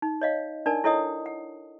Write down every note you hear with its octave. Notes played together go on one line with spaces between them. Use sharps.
D#4
C#5 D#5 F5
D4 D#4 A#4 D5 A5
E4 A4 C#5 D#5 F#5 D#6
F#5